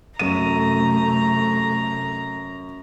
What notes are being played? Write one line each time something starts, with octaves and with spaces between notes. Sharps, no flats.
F#2 C3 A3 A#5 D#7